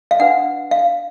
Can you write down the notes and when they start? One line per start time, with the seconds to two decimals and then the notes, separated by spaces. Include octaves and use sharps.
0.11 F5
0.19 D4 F#4 B4 F#5
0.71 F5